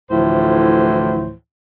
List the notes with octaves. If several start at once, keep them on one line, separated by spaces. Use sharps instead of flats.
D2 A2 E3 F3 E4 C5